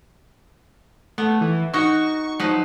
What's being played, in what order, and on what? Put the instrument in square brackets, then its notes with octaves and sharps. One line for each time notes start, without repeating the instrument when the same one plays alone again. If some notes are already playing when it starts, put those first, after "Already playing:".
[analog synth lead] A3 [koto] B3
[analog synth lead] E3
[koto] D#4 F#4 [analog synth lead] C#6
[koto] F3 D#4 B4 [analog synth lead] F#3